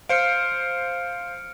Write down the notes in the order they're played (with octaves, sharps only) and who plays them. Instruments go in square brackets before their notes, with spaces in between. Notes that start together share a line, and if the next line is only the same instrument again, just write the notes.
[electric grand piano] C5 F5 [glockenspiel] F6 C#7 D7